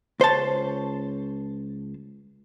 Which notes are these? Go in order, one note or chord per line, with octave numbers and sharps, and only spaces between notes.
C#2 C5 C#5 A5